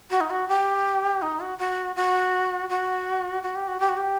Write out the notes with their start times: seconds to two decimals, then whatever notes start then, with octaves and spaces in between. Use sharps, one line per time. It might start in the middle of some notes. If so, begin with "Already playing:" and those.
0.10 F#4
0.21 D#4
0.30 F#4
0.48 G4
1.22 D#4
1.40 F#4
1.59 F#4
1.96 F#4
2.70 F#4
3.43 F#4
3.56 G4
3.68 F#4
3.80 G4
3.89 F#4
3.97 G4